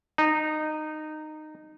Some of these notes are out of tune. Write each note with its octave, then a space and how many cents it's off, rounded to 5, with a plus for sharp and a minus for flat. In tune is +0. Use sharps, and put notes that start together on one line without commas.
D#4 -15